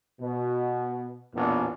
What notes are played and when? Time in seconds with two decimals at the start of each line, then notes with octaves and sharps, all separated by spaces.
0.21 B2
1.35 A1 E2 A#2 B3 D4